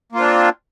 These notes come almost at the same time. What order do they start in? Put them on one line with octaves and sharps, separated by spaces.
A#3 F4 C4 D4